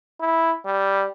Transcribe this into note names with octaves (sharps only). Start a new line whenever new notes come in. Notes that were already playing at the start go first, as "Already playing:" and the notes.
E4
G3